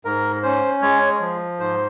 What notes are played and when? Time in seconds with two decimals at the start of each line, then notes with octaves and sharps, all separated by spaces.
0.05 G#2 A#4
0.43 C#4 C5
0.82 G#3 C#5
1.20 F3
1.60 G#2 C5